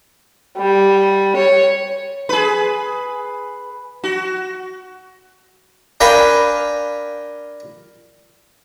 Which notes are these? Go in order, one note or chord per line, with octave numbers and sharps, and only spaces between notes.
G3
C#5
G#4 B4
F#4
D4 A#4 B4 F5 G5 G#5